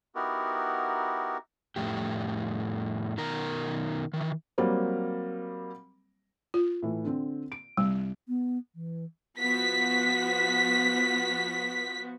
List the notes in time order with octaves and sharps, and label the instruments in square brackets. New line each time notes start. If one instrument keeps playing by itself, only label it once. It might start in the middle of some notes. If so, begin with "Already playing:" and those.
[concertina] B3 D#4 E4 F#4 G4 A#4
[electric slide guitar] F2 A2 G4
B2 D#3 A#4 A#5
D#3 E3
[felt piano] F#3 G3 A#3 C4
[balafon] F4
[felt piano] A2 E3
D3 C4
D7
[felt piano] C2 [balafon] G3
[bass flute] B3
E3
[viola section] F3 B3 F#4 [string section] B6